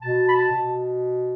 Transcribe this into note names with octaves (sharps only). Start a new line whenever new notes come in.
B2 A5
B5
A5
B2